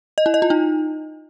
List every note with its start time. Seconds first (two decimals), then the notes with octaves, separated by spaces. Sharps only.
0.18 D#5
0.26 E4
0.34 D#5
0.42 F4
0.50 D#4